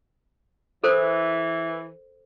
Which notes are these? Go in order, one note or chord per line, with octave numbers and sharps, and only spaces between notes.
E3 A4 A#4 C5